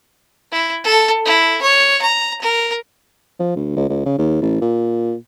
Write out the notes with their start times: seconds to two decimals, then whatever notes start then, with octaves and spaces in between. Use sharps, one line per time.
0.52 E4
0.84 A4
1.25 E4
1.62 C#5
2.02 A#5
2.42 A#4
3.40 F3
3.56 D2
3.76 C#2
3.89 C#2
4.05 C#3
4.18 D#2
4.41 A1
4.61 A#2